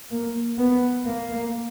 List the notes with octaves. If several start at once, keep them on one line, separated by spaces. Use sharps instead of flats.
A#3
B3
A#3